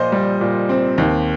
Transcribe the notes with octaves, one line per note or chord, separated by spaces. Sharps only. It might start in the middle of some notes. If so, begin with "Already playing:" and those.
Already playing: A#2 F3 C5 D#5
G3
A#2
C4
D#2